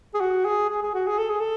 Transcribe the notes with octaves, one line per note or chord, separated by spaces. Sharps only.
G#4
F#4
G#4
G#4
G#4
F#4
G#4
A4
G#4
A4